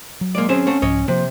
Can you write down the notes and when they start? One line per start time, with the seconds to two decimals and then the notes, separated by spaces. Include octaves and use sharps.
0.21 F#3
0.35 G#3 A#3 D5
0.49 C4 C#4 G#4 C5
0.67 A3 C4
0.82 C2 G#2 F3 C#5 D#5
1.08 C3 F3 A#3 C5